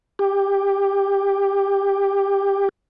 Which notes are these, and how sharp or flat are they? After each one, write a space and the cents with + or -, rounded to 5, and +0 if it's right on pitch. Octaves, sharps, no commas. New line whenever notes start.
G4 +15